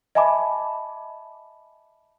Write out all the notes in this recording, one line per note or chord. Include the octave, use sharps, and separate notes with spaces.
D#5 E5 G#5 A5 B5 D6